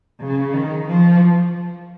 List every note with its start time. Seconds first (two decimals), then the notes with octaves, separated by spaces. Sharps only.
0.21 C#3
0.53 D#3
0.87 F3